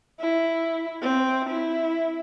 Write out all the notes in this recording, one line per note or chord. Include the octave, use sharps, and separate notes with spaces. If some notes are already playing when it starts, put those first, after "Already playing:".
E4
C4
E4